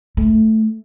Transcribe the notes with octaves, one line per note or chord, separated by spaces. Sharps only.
A3